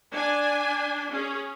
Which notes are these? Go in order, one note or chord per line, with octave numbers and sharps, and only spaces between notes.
D4 G#5
C#4 G#4